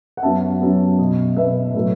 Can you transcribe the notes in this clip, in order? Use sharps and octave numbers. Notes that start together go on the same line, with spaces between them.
F#5
F#2 F#3 B3 E5 A5
F#2 F#3 B3
B2 B3
B2 B3 B4 E5
A2 F#3 A3